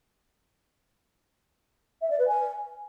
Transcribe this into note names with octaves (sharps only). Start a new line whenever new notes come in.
E5
D5
B4
G#5